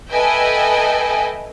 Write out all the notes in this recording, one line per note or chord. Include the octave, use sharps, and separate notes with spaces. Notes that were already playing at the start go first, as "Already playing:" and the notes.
A4 B4 D#5 E5 G5 G#5